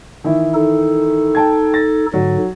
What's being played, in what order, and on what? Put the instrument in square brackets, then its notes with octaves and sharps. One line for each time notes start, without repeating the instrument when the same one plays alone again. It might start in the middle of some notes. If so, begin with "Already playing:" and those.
[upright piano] D#3 E3 E4
[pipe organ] D#4 A4
[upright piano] G5 A5 G#6
A6 A#6
[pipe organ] G#2 D3 [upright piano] F#3